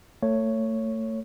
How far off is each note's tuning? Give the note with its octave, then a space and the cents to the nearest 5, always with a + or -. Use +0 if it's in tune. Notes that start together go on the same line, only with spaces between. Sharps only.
A3 +30 C#5 +0